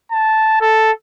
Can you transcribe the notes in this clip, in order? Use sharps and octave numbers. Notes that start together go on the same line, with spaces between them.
A5
A4